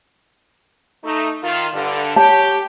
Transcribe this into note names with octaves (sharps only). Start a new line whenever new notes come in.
A3 D#4
D#3 F4
G2 D3
G4 C#5 A5